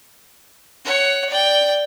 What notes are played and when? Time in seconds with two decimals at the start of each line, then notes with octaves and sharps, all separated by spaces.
0.85 C#5 F#5
1.30 D5 G5